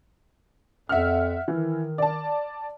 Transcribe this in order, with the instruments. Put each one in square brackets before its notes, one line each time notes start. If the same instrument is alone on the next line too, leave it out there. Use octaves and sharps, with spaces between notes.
[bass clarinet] F2 [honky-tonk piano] E5 F#5 F6
[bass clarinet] D#3 [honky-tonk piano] E3
[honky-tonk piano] D5 A5